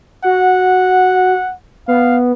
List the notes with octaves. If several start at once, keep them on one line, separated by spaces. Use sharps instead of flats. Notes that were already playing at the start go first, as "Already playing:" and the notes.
F#4 F#5
B3 F5